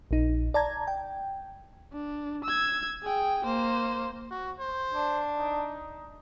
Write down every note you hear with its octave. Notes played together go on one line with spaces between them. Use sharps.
A#1 D#4
D5 A5 A#5 G#6
G5
D4
E6 G#6
G#4 G5
A#3 C5
F#4
C5
D4
D#4